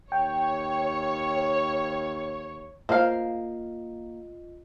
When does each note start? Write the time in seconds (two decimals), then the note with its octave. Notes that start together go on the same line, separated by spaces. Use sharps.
0.12 D#2 C#5 G5
2.89 A#3 F4 C5 D#5 F5